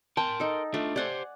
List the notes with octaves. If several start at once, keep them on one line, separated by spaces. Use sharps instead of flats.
A#4 G5 A5 C6
D#4 A4
A3 D4 F4
G4 C5 D5 F#5 G#5